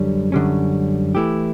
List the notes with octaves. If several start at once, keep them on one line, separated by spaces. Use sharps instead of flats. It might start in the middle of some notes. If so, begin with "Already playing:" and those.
Already playing: F#2 D3 G3 C#4
F#2 D3 G3 C#4
E3 A3 E4 G4